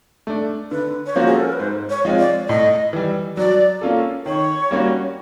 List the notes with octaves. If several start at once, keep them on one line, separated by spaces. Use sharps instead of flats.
A3 D4
D3 B4
C#5
F3 A#3 C#4 F#4 C5
G#4
A4
A#4
B4
G#2 C5
C#5
F3 G#3 C4 F4
D5
A2 D#5
E3 G3
F#3 D5
A#3 C#4 F4 A4
D#3 C#5
G3 A#3 C#4 F#4